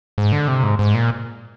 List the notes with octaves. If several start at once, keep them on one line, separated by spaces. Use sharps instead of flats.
G#2
D3
C3
G#2
G#2
A#2